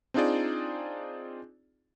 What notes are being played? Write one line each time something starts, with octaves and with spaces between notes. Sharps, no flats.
C4 D4 D#4 F4 G#4 D5